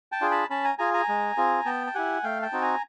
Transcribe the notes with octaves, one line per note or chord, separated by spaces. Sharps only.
G5 A5
D4 F4 G#4
A5 B5
C#4 A5 B5
G#5 A#5
F4 G#4 G#5 A#5
G#5 A#5
G#3
C4 F4 G#4
B3 G5 A5
A5
E4 G4 F#5 G#5
A3 F5 G5
G5 A5
C4 D#4 F#4
G#5 A#5